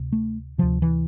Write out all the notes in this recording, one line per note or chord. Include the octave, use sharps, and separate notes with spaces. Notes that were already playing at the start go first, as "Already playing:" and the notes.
Already playing: D2 C3
A3
D2 C3 F3
E3